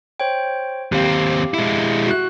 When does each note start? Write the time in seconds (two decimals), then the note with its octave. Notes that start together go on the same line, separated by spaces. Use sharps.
0.20 C5 C#5 G5
0.92 D#2 C4 G4 F5
1.54 G#3 E4
2.06 F#4 F#6